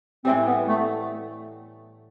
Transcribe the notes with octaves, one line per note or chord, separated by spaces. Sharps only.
A2 E3 G3 C4
B3
A3